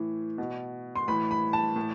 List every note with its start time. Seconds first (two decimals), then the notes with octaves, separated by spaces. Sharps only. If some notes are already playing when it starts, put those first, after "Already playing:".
Already playing: A2 E3
0.38 B2
0.96 C6
1.08 A2 E3 B5
1.31 B5
1.53 A5
1.76 A2 E3